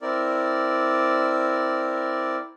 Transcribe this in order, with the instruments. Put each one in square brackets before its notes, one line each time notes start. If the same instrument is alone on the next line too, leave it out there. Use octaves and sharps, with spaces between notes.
[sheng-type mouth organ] C4 E4 A#4 D5